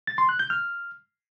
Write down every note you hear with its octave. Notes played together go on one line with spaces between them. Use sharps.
A6
C6
F#6
G6
F6